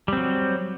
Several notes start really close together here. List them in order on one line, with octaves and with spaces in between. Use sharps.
G3 C4 F#3